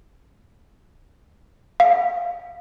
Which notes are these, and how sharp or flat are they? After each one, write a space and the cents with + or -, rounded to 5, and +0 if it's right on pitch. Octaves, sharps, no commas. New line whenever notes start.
F5 +5